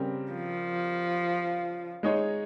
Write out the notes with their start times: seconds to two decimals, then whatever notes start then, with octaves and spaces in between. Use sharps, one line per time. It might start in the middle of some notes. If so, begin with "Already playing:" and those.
Already playing: C#3 G3 C4 A#4
0.32 F3
2.03 G#3 D#4 G#4 C#5